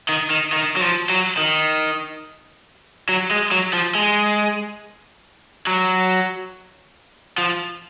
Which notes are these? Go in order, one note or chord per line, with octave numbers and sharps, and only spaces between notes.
D#3
D#3
D#3
F#3
F3
F#3
D#3
F#3
G#3
F#3
F3
G#3
F#3
F3